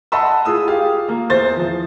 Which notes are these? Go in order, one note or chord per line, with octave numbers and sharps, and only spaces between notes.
D#5 F#5 A5 B5 C6 E6
F4 G#4 D#6 E6
F4 G4 G#4 F5
A#3
E2 C5 C6 A6
E3 F3